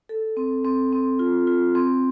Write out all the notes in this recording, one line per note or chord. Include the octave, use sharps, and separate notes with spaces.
A4
C4
C4
C4
F4
F4
C4